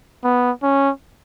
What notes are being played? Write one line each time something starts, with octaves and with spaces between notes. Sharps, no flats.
B3
C#4